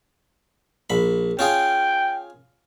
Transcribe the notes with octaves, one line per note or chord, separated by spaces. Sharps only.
A#1 B5
C#4 F4 G#4 G5